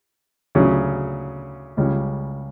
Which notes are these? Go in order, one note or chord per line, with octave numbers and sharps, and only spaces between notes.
D2 C#3 F#3 C#4
C#2 C#3 G3 C#4